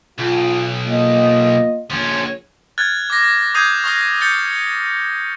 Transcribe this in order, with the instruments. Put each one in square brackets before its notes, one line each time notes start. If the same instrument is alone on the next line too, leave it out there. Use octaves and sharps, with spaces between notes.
[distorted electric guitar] B1 [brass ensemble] F4
[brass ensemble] A#3 F4 D#5
[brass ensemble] A#1 C#3 [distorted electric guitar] F3 C#4
[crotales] F6 F#6 G#6 A6
D6 A#6
D6 D#6 G6 G#6 C7 D#7
C#6 D#6 F6 A#6
G6 A6 C#7 G7